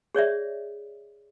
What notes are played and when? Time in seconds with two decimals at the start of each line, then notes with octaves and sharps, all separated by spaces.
0.15 G#4 C#5 D5 E5